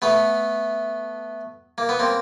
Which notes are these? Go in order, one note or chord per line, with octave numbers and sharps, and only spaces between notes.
A3 B3
A#3
B3
A#3 C4